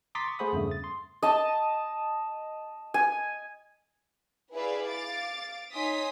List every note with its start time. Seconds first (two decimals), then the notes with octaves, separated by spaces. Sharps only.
0.15 A#5 C6 D6 D#6 A6 B6
0.27 C#6
0.39 A3 G#4 C5 F#5 B5 D#6
0.53 E2 G2 C#3 A3
0.68 D#6 A6
0.84 C6
1.22 D#5 A5
2.94 G#5
4.53 E4 G#4 B4 D5 E5 F5
4.87 F5 D6 A6
5.73 D#4 C#5 G#5 C6 D#6 B6